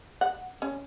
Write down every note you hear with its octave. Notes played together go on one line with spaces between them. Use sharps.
F#5
C#4